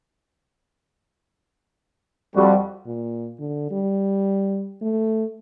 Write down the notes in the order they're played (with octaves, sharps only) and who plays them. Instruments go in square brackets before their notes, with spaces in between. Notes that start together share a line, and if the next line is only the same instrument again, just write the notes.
[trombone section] F2 F#4 [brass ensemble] G3
[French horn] A#2
D3
G3
A3